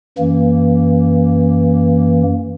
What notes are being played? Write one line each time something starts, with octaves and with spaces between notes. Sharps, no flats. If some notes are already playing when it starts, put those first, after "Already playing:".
F#2 E3 A#3